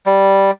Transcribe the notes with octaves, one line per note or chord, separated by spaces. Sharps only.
G3